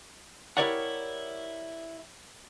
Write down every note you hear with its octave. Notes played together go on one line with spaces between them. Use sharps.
E4 G4 A#4 C#5 D5 F#5